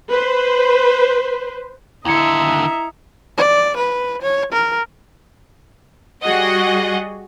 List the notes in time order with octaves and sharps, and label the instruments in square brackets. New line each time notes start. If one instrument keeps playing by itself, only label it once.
[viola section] B4 C5
[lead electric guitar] D#2 D3 [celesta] E4 G#6 C#7 [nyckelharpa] D#5 E5 [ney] A#5
[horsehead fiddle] D5
B4
C#5
A#4
[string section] G3 F#4 G#4 D#5 F#5